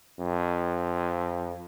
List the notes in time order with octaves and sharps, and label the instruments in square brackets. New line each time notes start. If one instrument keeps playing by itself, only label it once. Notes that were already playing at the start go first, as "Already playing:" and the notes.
[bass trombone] F2